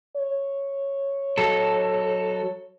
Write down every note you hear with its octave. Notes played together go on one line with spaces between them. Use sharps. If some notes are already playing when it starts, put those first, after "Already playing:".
C#5
F#3 A4